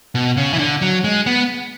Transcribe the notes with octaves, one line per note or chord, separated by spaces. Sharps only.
B2
C#3
E3
D3
F#3
G#3
B3